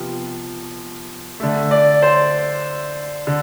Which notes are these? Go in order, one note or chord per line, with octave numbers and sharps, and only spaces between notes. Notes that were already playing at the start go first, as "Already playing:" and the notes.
Already playing: C3 F3 B3
D3 A3
D5
C5
D3